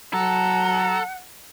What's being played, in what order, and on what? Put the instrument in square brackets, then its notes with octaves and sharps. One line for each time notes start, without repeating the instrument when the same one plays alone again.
[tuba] F#3 [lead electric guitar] A4 [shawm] F#5 [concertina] A#5